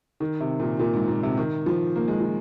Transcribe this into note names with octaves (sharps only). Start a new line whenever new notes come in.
D#3
C3
A#2
A#2
G#2
A#2
C3
D#3
F3
A#3
G#3
F3